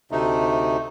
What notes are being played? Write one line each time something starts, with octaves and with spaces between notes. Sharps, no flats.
D2 C3 A3 D#4